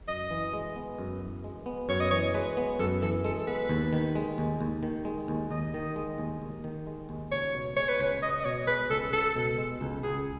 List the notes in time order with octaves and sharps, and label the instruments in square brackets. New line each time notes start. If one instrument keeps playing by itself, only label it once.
[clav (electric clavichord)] F#2 [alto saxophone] D#5
[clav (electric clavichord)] E3
G#3
B3
F#2
E3
G#3
B3
[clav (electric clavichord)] F#2 [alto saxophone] C#5
[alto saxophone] D#5
[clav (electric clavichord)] E3 [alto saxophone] C#5
[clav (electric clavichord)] G#3 [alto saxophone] B4
[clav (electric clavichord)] B3
[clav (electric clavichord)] F#2 [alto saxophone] A4
[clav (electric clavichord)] E3 [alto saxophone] A4
[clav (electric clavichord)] G#3 [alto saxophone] A4
[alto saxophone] A4
[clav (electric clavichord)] B3 [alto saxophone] B4
[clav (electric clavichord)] D#2
D#3
G#3
D#2
D#2
D#3
G#3
D#2
[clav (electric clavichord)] D#2 [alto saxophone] D#5
[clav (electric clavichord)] D#3
G#3
D#2
D#2
D#3
G#3
D#2
[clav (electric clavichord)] C#2 [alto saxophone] C#5
[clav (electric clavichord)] B2
[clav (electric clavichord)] G#3 [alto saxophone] C#5
[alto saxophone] B4
[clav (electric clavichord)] C#2 [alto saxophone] C#5
[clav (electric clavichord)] C#2 [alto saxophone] D#5
[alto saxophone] D#5
[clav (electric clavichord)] B2 [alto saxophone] C#5
[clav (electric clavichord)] G#3 [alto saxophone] B4
[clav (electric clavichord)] C#2 [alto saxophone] A4
[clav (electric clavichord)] C#2 [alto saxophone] A4
[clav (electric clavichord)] B2
G#3
C#2
[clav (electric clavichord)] C#2 [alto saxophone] G#4